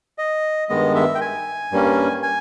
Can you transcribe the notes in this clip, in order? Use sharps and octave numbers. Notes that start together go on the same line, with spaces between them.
D#5
G2 D#3 G#3 B3 D#5
E5
G5
G#5
G2 G3 A#3 C#4
G#5